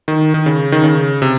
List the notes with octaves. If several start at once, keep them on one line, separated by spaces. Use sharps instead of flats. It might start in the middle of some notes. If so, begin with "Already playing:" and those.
D#3
D#3
C#3
D#3
C#3
C3